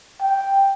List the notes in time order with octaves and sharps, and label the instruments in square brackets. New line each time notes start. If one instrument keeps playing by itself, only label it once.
[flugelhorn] G5